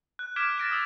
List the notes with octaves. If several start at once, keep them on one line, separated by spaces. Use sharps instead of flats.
F#6
D6 F6 G#6 B6 D7 E7
A6 A#6 D7 E7
D#6 E6 D7